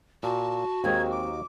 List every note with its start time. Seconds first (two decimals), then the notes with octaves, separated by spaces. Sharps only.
0.23 A#2 F#4 A5
0.84 D#2 D#3 G#3 C4 G#6
1.11 D6